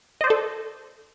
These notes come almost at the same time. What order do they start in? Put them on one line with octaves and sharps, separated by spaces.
D#5 C5 D5 A4